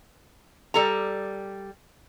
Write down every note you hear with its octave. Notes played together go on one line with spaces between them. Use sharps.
G3 A4 A#5